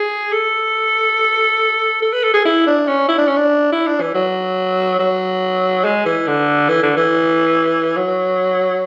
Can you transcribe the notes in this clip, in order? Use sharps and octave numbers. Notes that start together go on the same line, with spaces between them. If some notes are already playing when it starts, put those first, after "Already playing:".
Already playing: G#4
A4
A4
B4
A4
G#4
E4
D4
C#4
E4
D4
C#4
D4
E4
D4
E3
F#3
F#3
G#3
E3
D3
E3
D3
E3
F#3